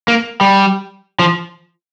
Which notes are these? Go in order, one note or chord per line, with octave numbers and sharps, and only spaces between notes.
A#3
G3
F3